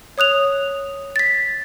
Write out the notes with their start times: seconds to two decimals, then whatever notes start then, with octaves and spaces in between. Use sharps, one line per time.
0.18 C#5 D#6 F#6 F7
1.16 A6 B6